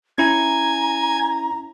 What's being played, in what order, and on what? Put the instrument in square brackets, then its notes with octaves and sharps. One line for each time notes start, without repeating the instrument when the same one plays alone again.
[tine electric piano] C#4 E4 [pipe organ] G#5 G#6 [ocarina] A#5